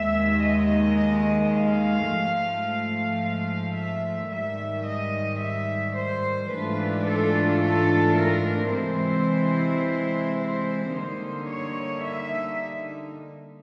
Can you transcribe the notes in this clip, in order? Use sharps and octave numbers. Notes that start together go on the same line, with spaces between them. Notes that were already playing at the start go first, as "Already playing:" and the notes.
Already playing: D#2 D#3 G#3 E5
D#5
F5
G#2 F3 A3
F5
E5
G#2 D#3 G3 E5
D#5
E5
C5
G#2 E3 A3 D4 F4 B4
A4
A4
A#4
C3 E3 G#3 C4 E4 C5
C5
D3 G3 A#3 D#4 C5
C#5
E5